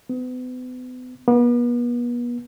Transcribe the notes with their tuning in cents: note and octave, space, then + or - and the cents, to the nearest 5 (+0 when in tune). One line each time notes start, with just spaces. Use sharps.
B3 +35
B3 -40